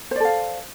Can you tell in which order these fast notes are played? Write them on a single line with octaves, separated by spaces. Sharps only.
C5 D5 A4 F5